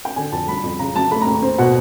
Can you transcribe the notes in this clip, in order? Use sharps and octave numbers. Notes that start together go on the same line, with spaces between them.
G5
D3 G#5
F2 A5
G3 B5
F2
C#3 A#5
F#3 A5
A3 B5
A#5
D#2
C4
B2 F#5